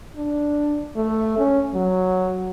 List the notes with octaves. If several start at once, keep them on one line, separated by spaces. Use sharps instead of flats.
D4
A3
C#4
F#3